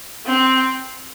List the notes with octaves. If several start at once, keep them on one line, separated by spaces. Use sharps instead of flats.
C4